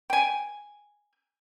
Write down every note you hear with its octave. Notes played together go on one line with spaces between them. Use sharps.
G5 G#5